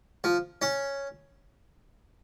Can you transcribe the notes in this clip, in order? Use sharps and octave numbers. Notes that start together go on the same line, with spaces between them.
F3
C#4